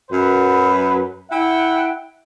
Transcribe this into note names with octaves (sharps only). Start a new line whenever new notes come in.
F#2 B4
E4 E5 F#5 G5